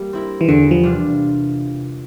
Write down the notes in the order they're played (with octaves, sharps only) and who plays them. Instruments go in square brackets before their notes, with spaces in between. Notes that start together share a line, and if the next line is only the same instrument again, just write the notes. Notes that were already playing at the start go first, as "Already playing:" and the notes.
Already playing: [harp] G3 A#3
C4 E4 A#4
[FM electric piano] E3
[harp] E2 [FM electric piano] D3
[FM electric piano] F3
[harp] C3 G3 D4 F4